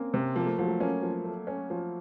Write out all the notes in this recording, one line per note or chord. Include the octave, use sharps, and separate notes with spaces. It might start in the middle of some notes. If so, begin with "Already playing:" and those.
Already playing: A#3 C4 C#4
C3
F3 A#3
A3
F3 F#3
A3
A#3 C#4
F3
A3
C#4
F3